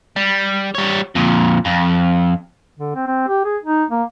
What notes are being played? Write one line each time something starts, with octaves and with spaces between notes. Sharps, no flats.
G3
G3 C#5
F2 A#2
F2
D3
C4
C4
G4
G#4
D#4
A#3